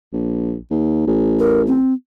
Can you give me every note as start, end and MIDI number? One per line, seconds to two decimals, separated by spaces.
0.13 0.56 34
0.71 1.03 39
1.07 1.78 33
1.39 1.62 70
1.67 1.94 60